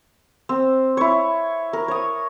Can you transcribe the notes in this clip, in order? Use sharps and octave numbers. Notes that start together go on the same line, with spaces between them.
C4
E4 C#5
A#4
C#5 D#6